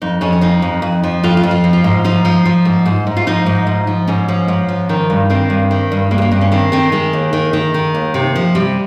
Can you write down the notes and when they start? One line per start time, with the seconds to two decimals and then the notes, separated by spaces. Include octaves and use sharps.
0.02 F2 D#4
0.21 F2 C#4
0.32 C#4
0.41 F3 D#4
0.62 F2
0.82 F2
1.04 F3
1.23 F2 F4
1.37 F4
1.43 F2
1.51 F4
1.64 F3
1.73 F4
1.84 G#2
2.04 F3 D#4
2.25 F3
2.45 F3
2.65 G#2
2.86 G#2
3.07 G#2
3.17 F4
3.27 F3 D#4
3.46 G#2
3.67 G#2
3.87 F3
4.07 G#2 C#4
4.28 F3
4.48 G#2
4.68 F3
4.89 D#3
5.10 G2
5.30 D#3 C4
5.50 G2
5.71 D#3
5.92 G2
6.11 G2 A#3
6.18 G#3
6.22 A#3
6.31 G2 C4
6.41 C#4
6.52 D#3 C4
6.72 D#3 C4
6.92 D#3 G#3
7.13 D#2
7.33 D#3
7.53 D#3
7.74 D#3
7.95 D#2
8.14 C3
8.36 F3
8.55 C3 G3